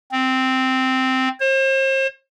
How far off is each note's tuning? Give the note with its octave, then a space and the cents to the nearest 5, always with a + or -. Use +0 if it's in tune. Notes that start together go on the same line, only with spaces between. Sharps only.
C4 -5
C5 +40